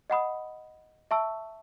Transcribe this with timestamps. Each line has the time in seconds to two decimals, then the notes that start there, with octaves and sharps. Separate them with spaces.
0.10 D#5 F#5 B5 D#6
1.11 E5 A5 C#6 E6